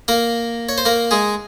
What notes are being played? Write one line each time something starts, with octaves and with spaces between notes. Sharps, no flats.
A#3 A#4
C#5
C5
A#3 A#4
G#3 G#4